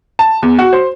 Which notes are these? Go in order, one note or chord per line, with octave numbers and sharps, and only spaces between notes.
A5
E2
F#4
C5